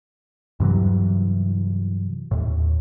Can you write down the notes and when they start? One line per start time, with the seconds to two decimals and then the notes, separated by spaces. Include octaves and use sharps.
0.60 G2 C3 E3 F#3
2.31 D#2 A2